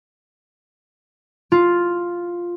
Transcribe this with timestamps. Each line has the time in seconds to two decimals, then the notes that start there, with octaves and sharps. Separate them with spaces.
1.52 F4